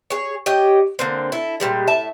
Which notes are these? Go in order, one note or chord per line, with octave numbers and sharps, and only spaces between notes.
G#4 C#5
G4 C#5 D#5 G5
D3 A#3 C4
E4 A4
A#2 F3 G3 G#3
A2 E5 A5